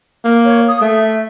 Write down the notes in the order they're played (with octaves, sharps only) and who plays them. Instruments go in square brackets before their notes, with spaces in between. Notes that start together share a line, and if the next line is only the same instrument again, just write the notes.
[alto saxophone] A#3
[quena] C#5
D#6
[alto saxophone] A3 [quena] E5